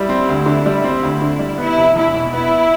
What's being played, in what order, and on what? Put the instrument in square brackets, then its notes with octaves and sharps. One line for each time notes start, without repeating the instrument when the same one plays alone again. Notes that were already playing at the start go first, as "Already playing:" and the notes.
Already playing: [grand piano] G3 [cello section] E4
[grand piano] C4
D2
D3
G3
C4
D2
D3
G3
[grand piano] B3 [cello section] E4
[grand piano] F1
[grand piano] E2 [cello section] E4
[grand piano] B2
[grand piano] B3 [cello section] E4